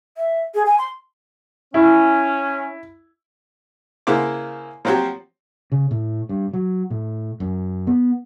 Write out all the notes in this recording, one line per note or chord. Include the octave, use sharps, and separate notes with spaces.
E5
G#4
G#5
C6
C#4 E4
C#3 A#3 E4 C5 F#5 D6
F3 F#3 C4 F#4 G4
C#3
A2
G2
F#3
A2
F#2
B3